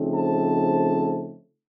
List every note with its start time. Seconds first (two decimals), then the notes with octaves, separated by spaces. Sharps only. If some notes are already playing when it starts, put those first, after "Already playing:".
Already playing: C#3 F3 A3 C4 D#4
0.13 A5